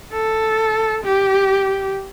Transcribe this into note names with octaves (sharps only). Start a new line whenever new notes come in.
A4
G4